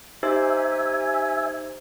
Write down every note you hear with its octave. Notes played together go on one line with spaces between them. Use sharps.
D#4 G4 C5 E5 G#5